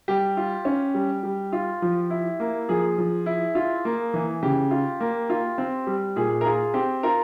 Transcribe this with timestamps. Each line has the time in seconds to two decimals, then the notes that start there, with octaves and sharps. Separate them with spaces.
0.08 G3 G4
0.37 F4
0.65 C#4
0.94 G3
1.23 G3
1.53 F4
1.82 F3
2.10 E4
2.40 A#3
2.69 F3 G#4
2.98 F3
3.26 E4
3.55 F4
3.85 A#3
4.14 E3
4.43 C#3 G4
4.71 F4
5.00 A#3
5.30 F4
5.58 C4
5.87 G3
6.16 A#2 G#4
6.41 A#4
6.45 F4 G#4
6.74 C4 G4
7.03 F4 A#4